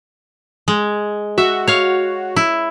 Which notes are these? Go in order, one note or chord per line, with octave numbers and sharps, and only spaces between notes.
G#3
F#4 E5
C#5 F5
E4